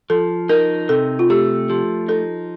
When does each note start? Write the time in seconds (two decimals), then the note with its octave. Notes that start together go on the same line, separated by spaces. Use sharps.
0.10 F3 A4
0.49 D#4 A#4
0.89 C3 A4
1.19 F4
1.30 A3 G4
1.70 F3 G4
2.08 D#4 A4